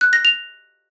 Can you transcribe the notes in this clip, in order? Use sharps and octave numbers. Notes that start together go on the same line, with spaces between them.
F#6
A#6
F7